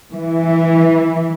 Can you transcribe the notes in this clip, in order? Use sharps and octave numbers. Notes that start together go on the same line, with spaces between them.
E3